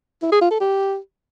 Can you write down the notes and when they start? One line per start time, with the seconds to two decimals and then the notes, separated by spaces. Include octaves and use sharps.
0.22 E4
0.32 G#4
0.41 F4
0.51 A4
0.60 G4